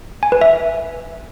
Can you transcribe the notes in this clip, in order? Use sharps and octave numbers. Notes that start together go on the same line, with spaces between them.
G#5
B4
E5